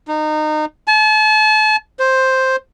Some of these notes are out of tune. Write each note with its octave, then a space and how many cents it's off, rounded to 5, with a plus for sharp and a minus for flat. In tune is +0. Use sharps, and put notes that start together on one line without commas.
D#4 -25
A5 -40
C5 +5